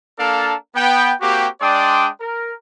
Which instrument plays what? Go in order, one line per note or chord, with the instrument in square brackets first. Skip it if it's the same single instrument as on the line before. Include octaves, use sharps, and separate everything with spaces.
[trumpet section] A#3 D4 A4 A#4 F5 A5
B3 G5
A#3 C4 F#4 G4
G#3 D4 D5 G5 C6 D#6
A#4